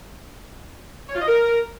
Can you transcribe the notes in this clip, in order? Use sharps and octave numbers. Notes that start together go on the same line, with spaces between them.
C#5
F4
D#5
A#4